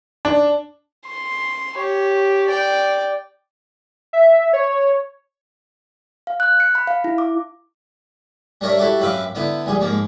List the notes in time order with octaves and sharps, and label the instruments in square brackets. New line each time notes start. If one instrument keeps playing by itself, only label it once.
[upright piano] D4
[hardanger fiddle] C6
G4 C#5
D5 G5
[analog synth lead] E5
C#5
[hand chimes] F5
F#6
C#7
B5
F5
E4
D6
[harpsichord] G3 D4 A#4 C#5 E5
E4 F#4 G4 A4 E5
F#2 C4 B4 E5 F5 D6
D3 B3 E4
A#1 G3 G#4 C6
G#2 F3 A#3